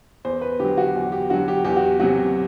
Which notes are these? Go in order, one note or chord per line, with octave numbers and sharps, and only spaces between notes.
E2 C5
B4
D3 F#3 G4
F#4
E2
G4
D3 F#3 F#4
G4
E2 G4
F#4
C3 F#3 F#4